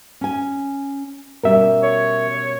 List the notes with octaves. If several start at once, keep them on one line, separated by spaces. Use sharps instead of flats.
C#4 G#5
B2 G3 C#4 A#4 E5
C#5